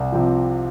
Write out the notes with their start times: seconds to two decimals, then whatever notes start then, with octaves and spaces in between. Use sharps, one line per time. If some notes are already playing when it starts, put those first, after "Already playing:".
Already playing: C2
0.12 C3 F3